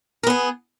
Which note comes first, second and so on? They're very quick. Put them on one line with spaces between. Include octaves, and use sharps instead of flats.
A#4 B3 G#4